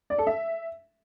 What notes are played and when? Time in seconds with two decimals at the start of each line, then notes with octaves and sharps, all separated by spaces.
0.10 D5
0.18 A4
0.27 E5